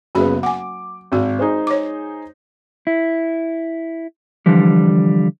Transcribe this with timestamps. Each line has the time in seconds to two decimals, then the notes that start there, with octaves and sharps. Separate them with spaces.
0.15 F#1 C#3 F#3 B3 F#4 B5
0.43 F#5 G#5 D6
1.12 G#1 G#3 F#4
1.39 D#4 G#4 C5
1.67 C#5 D6
2.87 E4
4.46 D3 E3 F3 G3